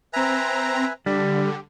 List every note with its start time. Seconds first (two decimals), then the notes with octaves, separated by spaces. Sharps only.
0.13 C4 B4 E5 G#5 A#5
1.06 D3 G3 G4